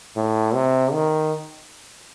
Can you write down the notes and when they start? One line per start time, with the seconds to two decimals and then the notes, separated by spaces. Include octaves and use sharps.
0.16 A2
0.55 C3
0.93 D#3